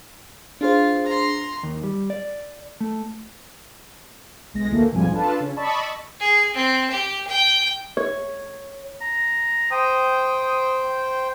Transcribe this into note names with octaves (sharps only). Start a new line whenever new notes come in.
D4 F4 G#4 C5
A#5 C6
D#2
G3
D5
A3
B1 G#3 A#6
D2 A2 D3 E3 A3 A#3
B1 F2 G#2 F3 G3 G#5
D4 F4 A4 B4 A5
C#3 C#4
D5 D#5 A5 B5 C#6 E6
G#4
C4
G4
G5
C#5
A#5
C5 G5 D#6